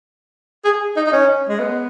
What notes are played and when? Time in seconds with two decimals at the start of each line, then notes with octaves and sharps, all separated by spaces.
0.65 G#4
0.97 D#4
1.07 D#4
1.12 C#4
1.49 G#3
1.59 B3